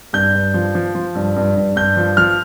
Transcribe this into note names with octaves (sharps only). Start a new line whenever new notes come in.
G2 G6
G2
F3
F3
F3
G2
G2
G2
G2 G6
F3
F3 F6